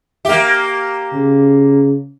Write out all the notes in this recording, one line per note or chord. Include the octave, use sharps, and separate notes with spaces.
A#3 G4 E5
C#3